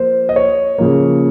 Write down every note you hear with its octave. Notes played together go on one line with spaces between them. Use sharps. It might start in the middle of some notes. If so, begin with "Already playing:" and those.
Already playing: F3 A#3 F4 C5
D#5
C#5
C#3 F3 A#3